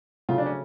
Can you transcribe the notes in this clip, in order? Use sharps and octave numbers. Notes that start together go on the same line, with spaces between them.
C#3 F#3 A3 F4
D4
C#4